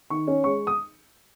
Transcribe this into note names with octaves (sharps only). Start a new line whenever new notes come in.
D#3 C#6
C#4
G#3 C#6
D#6